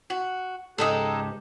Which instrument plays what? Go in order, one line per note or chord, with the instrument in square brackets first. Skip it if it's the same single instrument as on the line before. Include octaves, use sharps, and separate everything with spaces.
[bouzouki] F#4
[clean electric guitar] C#2 G#2 [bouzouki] G#3 D#4 A4 [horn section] G4